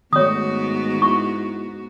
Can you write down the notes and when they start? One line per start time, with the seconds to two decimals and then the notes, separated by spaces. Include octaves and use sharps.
0.13 G#2 D#3 A3 B3 F#4 C#5 D#6
1.02 E4 C#6